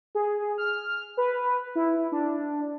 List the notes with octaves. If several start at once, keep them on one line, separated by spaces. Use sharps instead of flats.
G#4
F6
B4
E4
D4